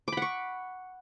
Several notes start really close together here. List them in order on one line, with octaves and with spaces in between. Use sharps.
D6 B5 F#5 C#6